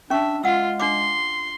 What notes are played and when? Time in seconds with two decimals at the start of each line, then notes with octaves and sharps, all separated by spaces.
0.10 C#4 D4 E5 C#6
0.44 G#3 F4 F#5 E6
0.80 D4 C6 D6